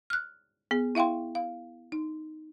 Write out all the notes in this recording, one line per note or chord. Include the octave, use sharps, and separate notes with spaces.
F6 F#6
B3 G#4
E4 E5 F5 G5 C6
F5
D#4